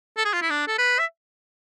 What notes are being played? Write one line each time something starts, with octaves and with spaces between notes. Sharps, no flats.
A4
G#4
F4
E4
D4
A4
B4
E5